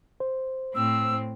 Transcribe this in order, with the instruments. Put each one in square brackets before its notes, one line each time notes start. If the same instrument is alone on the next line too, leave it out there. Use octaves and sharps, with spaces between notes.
[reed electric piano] C5
[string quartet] A2 C4 [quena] E6